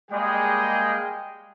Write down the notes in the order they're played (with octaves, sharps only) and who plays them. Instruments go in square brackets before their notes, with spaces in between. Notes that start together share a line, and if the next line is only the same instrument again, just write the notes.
[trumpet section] G3 G#3 A#3 G#4 D#5 G5